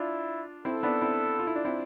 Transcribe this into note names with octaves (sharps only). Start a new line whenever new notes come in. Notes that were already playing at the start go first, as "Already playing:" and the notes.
Already playing: D4 E4 F4
C4 E4 A4
B3 D4
C4 E4
F4
E4
D4
C4 E4